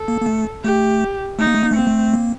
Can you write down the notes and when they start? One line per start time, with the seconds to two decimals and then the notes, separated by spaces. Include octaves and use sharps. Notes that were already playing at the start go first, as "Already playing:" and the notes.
Already playing: A4
0.08 A#3
0.21 A#3
0.26 A3
0.64 A3 G4
1.39 A3 D#4
1.47 A#3
1.55 A3
1.63 A#3
1.71 A3
1.76 A#3 C4
1.87 A3
2.13 A#3